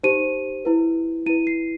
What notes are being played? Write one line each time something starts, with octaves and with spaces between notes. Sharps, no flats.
D#4 G4 C5 D#7
E4 B4
E4 B4 D#7
C7